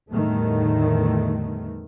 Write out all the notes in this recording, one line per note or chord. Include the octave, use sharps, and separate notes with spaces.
E2 A2 D3 D#3 G3 A3